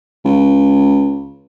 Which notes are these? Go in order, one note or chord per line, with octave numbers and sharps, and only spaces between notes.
C#2